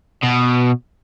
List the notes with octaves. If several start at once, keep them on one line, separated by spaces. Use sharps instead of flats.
B2